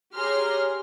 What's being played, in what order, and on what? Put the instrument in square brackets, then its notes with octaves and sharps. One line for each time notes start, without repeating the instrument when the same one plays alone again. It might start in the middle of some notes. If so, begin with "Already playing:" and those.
[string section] G4 G#4 C#5 A#5 C6 F6